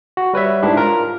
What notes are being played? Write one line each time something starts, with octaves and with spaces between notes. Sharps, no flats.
F#4
G3 B4 C#5 E5
G#2 D4 E4 G4
F4 A#4